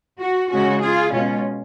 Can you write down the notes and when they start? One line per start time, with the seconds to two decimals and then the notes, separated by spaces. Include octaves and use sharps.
0.19 F#4
0.50 C#3 G#3 C#4 F#4
0.81 F4 G#4
1.13 B2 G#3 C#4 F4